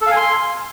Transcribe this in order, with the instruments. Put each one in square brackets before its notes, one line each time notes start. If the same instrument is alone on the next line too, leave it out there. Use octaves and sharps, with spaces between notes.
[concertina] A4
F5
G#5
C6